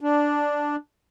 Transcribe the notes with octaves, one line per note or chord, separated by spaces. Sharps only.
D4